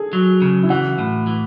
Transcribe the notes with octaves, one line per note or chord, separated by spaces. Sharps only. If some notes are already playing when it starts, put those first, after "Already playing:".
Already playing: G#4 A4
F#3
C#3
E4
E3 F#4
A2
E3